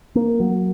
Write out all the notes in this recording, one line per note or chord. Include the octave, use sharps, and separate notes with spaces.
A#3
F#3